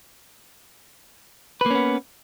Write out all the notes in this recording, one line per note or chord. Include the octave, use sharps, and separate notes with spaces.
A#3 B3 C#4 B4